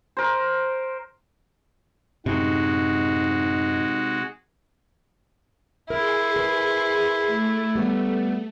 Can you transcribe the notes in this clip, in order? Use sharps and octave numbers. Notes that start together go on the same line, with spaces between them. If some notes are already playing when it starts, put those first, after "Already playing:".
A#4 C5
F#2 A2 C3 G#3 D#4 F#4
E4 G#4 A#4 C6
A#4 B4
A3
G3 B3